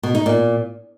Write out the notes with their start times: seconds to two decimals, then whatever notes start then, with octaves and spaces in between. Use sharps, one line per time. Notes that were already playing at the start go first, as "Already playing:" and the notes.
0.03 B2
0.15 D#4
0.26 A#2